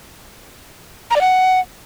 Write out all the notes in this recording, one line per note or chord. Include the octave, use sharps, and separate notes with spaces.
A#5
D5
F#5